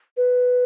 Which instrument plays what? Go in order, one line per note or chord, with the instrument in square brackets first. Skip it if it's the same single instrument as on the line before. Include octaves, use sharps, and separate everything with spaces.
[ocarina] B4